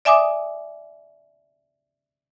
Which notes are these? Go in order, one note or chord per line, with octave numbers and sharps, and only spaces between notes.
D5 E5 G#5 D6 D#6